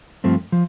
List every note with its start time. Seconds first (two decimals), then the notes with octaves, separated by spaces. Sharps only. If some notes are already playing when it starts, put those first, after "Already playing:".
0.24 G2 F3 A3 C4
0.52 F3